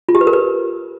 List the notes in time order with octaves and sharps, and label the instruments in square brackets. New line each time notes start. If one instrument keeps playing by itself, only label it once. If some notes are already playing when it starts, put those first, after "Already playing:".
[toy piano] F4
G4
B4
A#4
B4